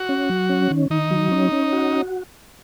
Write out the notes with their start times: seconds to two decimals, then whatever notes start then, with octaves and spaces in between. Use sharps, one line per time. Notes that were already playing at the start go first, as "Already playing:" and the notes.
Already playing: F#4
0.09 C#4
0.29 F#3
0.49 C#4
0.71 D#3
0.90 D#3 D#4
1.11 F#3
1.32 C#4
1.52 C#4
1.73 F#4